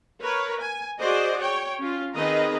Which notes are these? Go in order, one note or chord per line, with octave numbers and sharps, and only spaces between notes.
A#4 B4 C#5
G#5
F#4 G#4 C5 D5 D#5
C#5 G5
C#4 F4
D#3 C4 G#4 B4 D#5 A#5